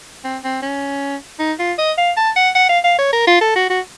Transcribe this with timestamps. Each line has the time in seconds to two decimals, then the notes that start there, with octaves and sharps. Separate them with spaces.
0.24 C4
0.44 C4
0.62 C#4
1.39 D#4
1.59 F4
1.78 D#5
1.98 F5
2.17 A5
2.36 F#5
2.55 F#5
2.69 F5
2.84 F5
2.98 C#5
3.13 A#4
3.27 F4
3.41 A4
3.55 F#4
3.70 F#4